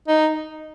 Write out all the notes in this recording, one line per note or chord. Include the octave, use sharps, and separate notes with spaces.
D#4